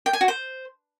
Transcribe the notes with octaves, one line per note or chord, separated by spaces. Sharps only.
G5
G#5
F#4
C5